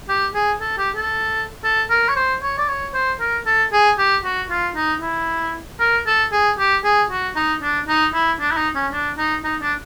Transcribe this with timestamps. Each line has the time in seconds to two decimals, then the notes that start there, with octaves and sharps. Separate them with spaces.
0.09 G4
0.34 G#4
0.61 A4
0.78 G4
0.95 A4
1.64 A4
1.90 A#4
2.09 C#5
2.16 C5
2.42 C#5
2.58 D5
2.68 C#5
2.94 C5
3.20 A#4
3.46 A4
3.72 G#4
3.98 G4
4.24 F#4
4.50 F4
4.76 D#4
5.01 E4
5.80 A#4
6.06 A4
6.32 G#4
6.58 G4
6.84 G#4
7.10 F#4
7.36 D#4
7.62 D4
7.88 D#4
8.14 E4
8.40 D4
8.51 E4
8.57 D#4
8.75 C#4
8.92 D4
9.18 D#4
9.44 D#4
9.61 D4